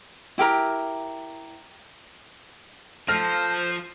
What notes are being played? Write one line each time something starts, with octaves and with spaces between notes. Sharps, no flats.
E4 G4 A#4 A#5
F3 A4 C5 F6 A#6